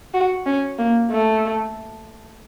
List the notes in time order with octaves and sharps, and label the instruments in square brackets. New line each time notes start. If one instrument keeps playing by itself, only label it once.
[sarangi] F#4
C#4
A#3
A3